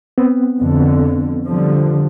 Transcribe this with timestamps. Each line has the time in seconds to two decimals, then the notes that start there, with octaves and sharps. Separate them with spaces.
0.18 B3 C4
0.61 F2 D3
1.48 D3 F3 G3